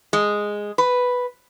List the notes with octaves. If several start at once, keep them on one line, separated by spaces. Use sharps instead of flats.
G#3
B4